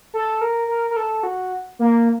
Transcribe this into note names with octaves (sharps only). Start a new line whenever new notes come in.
A4
A#4
A#4
A#4
A4
F#4
A#3